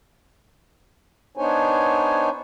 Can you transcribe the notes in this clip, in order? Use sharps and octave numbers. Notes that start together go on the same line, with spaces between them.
B3 D4 D#4 C5 C#5 G#5